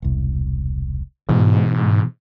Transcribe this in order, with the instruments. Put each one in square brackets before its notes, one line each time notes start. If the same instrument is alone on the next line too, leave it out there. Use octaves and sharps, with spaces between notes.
[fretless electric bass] E1 C2
[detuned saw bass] G#2 [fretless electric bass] B2 E3